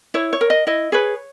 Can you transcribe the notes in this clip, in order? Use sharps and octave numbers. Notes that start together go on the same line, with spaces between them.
E4 C#5
C#5
A#4
D#5
E4 D#5
G#4 B4 C#5